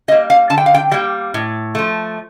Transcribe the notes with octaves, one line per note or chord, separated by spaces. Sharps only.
G3 A#3 D#5
F5
D3 A5
G5
F5
G5
G3 A#3 G5
A2
F3 A3